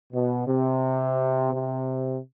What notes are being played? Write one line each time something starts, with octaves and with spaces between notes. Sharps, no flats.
B2
C3
C3